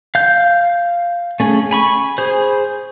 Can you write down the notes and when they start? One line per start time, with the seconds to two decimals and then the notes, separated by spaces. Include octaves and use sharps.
0.15 F5 G6
1.40 A3 C#4 G#4
1.71 G#5 B5 C#6
2.18 G#4 C5